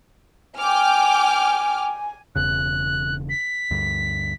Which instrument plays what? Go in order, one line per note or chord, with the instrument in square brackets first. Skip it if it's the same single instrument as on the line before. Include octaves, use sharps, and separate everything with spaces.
[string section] G5 D6 F6 [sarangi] G#5
[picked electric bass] E1 E2 C#3 [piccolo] F#6
[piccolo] B6
[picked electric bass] D2 G2